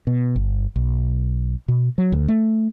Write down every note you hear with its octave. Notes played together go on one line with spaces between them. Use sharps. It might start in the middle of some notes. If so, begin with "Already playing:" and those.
B2
G1
B1
B2
F#3
D2
A3